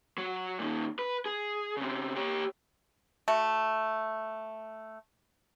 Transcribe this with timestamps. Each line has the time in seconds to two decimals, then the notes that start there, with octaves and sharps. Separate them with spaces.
0.18 F#3
0.59 A#2 D#3
0.99 B4
1.26 G#4
1.77 C#3 C4
2.16 G4 C#5
3.28 A3 F#4